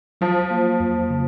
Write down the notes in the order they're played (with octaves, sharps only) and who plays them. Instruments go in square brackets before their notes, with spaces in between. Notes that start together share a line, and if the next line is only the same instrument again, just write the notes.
[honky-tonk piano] F3 [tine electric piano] F#3
[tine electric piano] A#3
F2
C#3